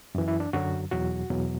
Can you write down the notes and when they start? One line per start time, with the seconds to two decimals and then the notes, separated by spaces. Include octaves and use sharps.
0.15 F#2 E3
0.28 E4
0.40 D4
0.53 F#2 D3 F#3 F#4
0.91 E2 B2 F#3 F#4
1.30 E2 B2 F#3